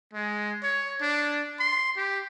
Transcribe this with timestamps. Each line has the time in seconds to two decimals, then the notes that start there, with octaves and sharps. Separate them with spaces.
0.13 G#3
0.63 C#5
1.01 D4
1.59 C6
1.97 G4